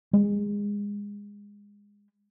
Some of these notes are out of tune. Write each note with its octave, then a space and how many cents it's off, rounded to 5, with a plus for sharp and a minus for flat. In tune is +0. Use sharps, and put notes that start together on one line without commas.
G#3 -25